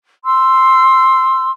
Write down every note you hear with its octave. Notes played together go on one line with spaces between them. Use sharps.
C6 E6